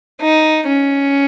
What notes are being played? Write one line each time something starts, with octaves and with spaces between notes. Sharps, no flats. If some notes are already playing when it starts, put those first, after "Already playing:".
D#4
C#4